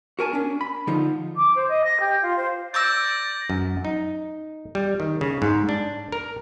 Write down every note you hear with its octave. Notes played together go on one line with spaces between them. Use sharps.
F#4 A#4 G#5 A5
C#4 D4
B5
D3 F3 D#4 F4
D6
C5
D#5
A#6
G4
F4
C5
D5 C#6 D6 E6 G6 A#6
F#2
D#4
G3
D#3
C#3
G#2
D4
A#4